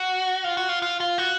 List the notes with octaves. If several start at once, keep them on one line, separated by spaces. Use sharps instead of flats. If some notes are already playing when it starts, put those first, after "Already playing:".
Already playing: F#4
F4
F#4
F4
F4
F4
F#4